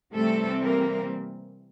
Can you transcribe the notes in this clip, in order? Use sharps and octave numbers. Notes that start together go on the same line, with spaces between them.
C3 E3 G3 A3 C4 A4
A#3 A#4